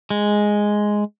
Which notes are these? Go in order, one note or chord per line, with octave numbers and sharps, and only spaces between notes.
G#3